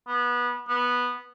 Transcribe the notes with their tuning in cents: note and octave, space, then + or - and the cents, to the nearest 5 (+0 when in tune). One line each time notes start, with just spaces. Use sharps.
B3 -20
B3 -10